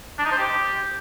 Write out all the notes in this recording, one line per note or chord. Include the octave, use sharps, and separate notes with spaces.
D4
D#4
C5
G4